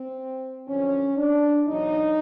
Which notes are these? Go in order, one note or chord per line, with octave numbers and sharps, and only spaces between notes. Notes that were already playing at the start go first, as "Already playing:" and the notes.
Already playing: C4
F#2 D3 F3 C#4
D4
E2 B2 F#3 D#4